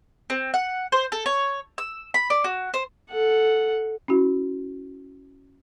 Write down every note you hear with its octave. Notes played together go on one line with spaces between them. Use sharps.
C4
F#5
C5
A4
C#5
E6
B5
D5
F#4
C5
A4 F#5
C#4 E4 F#4